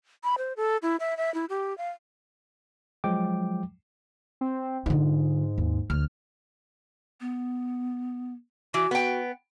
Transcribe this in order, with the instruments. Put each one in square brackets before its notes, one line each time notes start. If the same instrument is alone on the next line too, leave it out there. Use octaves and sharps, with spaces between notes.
[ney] B5
C5
A4
E4
E5
E5
E4
G4
F5
[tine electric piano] F3 F#3 G#3 G5 D6
[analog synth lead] C4
[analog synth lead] G#2 [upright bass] D3 F4
[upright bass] D#2
[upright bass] D2 [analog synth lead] F6
[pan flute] B3
[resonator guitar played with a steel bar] E3 [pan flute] F#4
[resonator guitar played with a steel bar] B3 G5